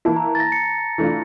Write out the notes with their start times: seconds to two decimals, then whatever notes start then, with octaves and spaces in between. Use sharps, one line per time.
0.05 E3 A#3 E4 A5
0.16 A#5
0.35 A6
0.40 A#6
0.52 C#7
0.98 E3 A3 D4 F4